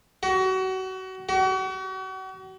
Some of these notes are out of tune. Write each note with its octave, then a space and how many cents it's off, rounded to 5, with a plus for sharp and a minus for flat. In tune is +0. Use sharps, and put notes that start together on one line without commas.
F#4 +30
F#4 +40